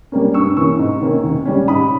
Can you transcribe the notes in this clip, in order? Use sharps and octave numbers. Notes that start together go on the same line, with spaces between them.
G3 A#3 C#4
G2 C#6 E6
E3 A#3 C#4 C#6 E6
G#2
D#3 A#3 C#4
D#2
C#3 G3 C#4
G#2 B5 D#6